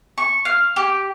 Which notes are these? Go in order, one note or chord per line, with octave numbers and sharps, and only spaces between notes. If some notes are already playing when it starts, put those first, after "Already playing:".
C#6
F5
G4